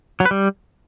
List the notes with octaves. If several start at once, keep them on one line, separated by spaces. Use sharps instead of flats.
F#3
B4
G3